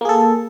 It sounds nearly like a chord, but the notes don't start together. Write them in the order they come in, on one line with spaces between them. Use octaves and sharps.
A#3 G#4 A4